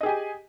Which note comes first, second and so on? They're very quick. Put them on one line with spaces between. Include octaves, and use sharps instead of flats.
D#5 G#4 G4 G#5